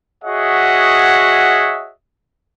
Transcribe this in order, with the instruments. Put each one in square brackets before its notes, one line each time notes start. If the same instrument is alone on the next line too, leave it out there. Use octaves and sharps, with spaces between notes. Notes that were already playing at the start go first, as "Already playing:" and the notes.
[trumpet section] F#4 G#4 C#5 D#5 E5 F#5